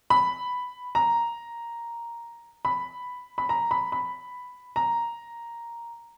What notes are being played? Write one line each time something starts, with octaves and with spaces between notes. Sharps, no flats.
B5
A#5
B5
B5
A#5
B5
B5
A#5